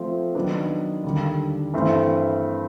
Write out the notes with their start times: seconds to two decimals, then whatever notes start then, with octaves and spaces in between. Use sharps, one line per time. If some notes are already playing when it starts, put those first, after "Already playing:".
Already playing: F3 A3 C4
0.35 D#3 F#3 B3 D4
1.04 D#2 D3 G3
1.73 G2 E3 A3 C4